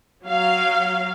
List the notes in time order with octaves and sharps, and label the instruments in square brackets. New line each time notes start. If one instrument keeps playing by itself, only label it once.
[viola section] F#3 F5